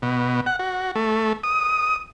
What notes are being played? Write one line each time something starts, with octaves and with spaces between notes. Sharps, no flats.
B2
F#5
F#4
A3
D#6